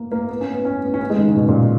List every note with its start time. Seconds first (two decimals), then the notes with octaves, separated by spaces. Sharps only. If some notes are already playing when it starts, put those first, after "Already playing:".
Already playing: A#3
0.12 A#3
0.29 B3
0.41 C#4
0.53 B3
0.65 C#4
0.83 B3
0.94 C#4
1.01 B3
1.10 G#3
1.18 D#3
1.28 C#3
1.36 B2
1.48 A#2